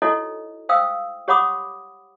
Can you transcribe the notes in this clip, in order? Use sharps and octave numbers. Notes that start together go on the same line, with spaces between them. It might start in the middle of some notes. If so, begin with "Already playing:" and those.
D#4 E4 F#4 A4 C#5 D#5
C5 F5 G5 D#6 E6
G4 C#5 F#5 B5 D6 D#6